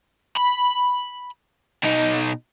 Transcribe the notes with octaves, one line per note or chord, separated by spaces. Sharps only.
B5
B2 D#4